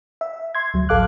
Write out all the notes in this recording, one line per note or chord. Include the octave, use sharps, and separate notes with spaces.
E5
C6 G#6
D2 F#3
A1 A4 F5 D6 F#6